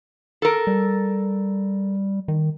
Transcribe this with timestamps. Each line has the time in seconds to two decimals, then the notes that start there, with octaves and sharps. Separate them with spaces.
0.42 A4 A#4
0.67 G3
2.28 D#3